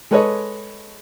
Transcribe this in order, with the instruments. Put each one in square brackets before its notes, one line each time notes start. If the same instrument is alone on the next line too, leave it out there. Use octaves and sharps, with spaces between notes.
[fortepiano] G#3 A4 B4 C#5 D#5